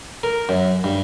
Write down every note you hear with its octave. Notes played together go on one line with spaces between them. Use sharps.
A#4
F#2
G2